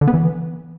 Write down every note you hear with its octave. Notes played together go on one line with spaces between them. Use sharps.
D3
B3
E3